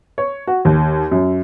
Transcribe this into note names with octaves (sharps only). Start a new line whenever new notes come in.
C#5
F#4
D#2
F#2